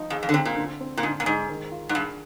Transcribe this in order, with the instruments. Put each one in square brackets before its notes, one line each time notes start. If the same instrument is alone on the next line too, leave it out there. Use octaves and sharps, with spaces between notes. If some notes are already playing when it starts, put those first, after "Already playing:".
Already playing: [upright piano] F3 D#4
[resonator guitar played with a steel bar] F2 [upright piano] G#4
[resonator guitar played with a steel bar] F2
D3
[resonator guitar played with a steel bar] C3 [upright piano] C4
[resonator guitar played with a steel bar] A#2
[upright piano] D3
C4
[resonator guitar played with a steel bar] A#2
[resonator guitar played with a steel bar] G#2 [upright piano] D3
[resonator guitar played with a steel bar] A#2
[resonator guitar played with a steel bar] G#2 [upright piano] G#3
[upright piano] D#3
F4
[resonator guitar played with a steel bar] G#2
[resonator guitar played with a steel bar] G2 [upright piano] G#4